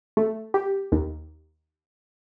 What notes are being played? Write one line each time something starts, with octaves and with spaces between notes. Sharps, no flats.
A3
G4
D#2